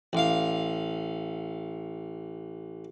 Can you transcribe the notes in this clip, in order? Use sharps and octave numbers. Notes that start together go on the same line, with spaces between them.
A1 F5